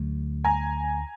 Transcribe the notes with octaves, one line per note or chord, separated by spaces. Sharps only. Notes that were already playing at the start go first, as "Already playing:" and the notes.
Already playing: D2 D3 F#3 A3
G#5 A#5